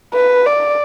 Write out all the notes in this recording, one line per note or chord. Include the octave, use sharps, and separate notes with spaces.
B4
D5